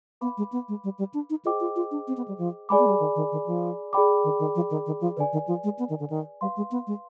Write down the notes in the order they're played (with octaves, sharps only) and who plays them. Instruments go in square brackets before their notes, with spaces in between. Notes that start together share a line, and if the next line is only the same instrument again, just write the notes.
[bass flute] B3 [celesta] B4 F5 B5 D6
[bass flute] G#3
B3
G#3
G3
G3
D4
D#4
[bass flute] F4 [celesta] G#4 C5 D#5 G5 D6
[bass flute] F4
F4
D4
C4
B3
G3
F3
[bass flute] G#3 [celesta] G#4 D5 G#5 B5 D6
[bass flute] B3
G#3
G3
D#3
D#3
D#3
F3
[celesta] G#4 D5 G5 B5 D6
[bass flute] D#3
D#3
F3
D#3
D#3
F3
[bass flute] D3 [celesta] B4 D5 G#5
[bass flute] D#3
F3
G#3
B3
D#3
D3
D#3
[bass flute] G3 [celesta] B4 F5 C6
[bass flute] G#3
B3
G#3